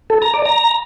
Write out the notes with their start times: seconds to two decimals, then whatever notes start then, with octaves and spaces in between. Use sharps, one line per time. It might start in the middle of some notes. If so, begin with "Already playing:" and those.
0.10 A4
0.22 A#5
0.34 D5
0.46 A#5